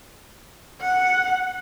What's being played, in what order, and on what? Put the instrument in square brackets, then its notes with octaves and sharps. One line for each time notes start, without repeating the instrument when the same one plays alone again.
[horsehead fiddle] F#5